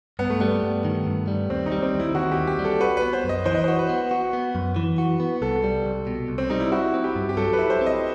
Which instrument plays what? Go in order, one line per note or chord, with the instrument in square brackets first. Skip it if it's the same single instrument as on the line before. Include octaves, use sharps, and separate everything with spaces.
[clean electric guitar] G2 [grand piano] B3
[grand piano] A3
[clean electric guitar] G3 [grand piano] B3
[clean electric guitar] G2
D#3
G2
G3
[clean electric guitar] D#2 [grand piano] C4
[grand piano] D#4
[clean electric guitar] G3
[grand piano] C4
[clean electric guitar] D#2
[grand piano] E4
[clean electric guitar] D#3 [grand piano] F#4
[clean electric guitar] D#2 [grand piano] G4
[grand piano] G4
[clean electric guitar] G3
[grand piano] A4
[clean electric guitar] F#4 [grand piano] B4
[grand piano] B4
[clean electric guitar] B3
[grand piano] C5
[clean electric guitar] F#2
[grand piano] D#5
[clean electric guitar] E3 [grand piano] C5
[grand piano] D#5
[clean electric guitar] F#4 [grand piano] C5
[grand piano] B4
[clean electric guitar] B3
F#4
B3
F#2
E3
F#4
B3
[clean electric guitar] C2 [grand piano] A4
[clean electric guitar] G3
C2
B2
C2
[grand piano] C4
[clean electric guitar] G3 [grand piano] D#4
[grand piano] E4
[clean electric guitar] E4 [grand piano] F#4
[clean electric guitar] C4
[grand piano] G4
[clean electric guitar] G2
[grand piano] G4
[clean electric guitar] F#3 [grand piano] A4
[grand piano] B4
[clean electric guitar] E4
[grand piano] C5
[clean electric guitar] C4
[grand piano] D#5